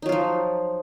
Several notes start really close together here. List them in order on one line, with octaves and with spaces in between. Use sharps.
D#4 F#3 F4 F3